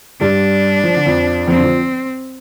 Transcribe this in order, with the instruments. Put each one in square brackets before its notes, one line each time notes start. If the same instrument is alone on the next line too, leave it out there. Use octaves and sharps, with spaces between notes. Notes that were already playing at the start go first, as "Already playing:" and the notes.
[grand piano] G2 G3 [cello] D4
[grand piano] F3
D3
F2 F3
[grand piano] F2 F3 [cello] C4
[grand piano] D3
F3